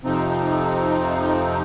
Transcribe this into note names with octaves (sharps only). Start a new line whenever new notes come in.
F2 C3 F3 C4 D#4